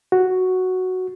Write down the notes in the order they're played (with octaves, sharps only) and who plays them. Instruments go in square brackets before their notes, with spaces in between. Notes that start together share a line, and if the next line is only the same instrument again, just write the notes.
[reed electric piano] F#4